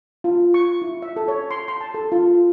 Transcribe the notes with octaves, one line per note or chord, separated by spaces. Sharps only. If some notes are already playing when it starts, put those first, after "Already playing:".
F4
C#6
E4
E5
A4
C#5
C6
C6
A5
A4
F4